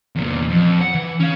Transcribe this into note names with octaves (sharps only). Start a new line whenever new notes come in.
E2 A#2
F2
F#5
E3
C#4 F5